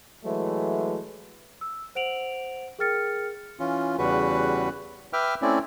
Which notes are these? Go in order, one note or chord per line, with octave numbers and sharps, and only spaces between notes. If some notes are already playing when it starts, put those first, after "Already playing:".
E3 F#3 G#3 A3
E6
C5 F#5 D7 F7 F#7
G#4 A#4 G5 F6 A6 C#7
E3 C#4 F4
E2 C#3 G3 F#4 B4
B4 E5 G5 D6 F6
A3 C4 C#4 E4 D5